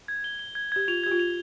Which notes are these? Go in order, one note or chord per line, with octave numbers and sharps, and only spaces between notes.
G#6
G7
G7
G#6
G4 G#6
F4 F7
G4 G#6
F4
F7